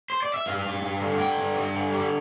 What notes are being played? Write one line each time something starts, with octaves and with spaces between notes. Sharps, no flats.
C5
D5
E5
G2 F5
G2
G2
D3
D3 G5
G2
G2
D3
G3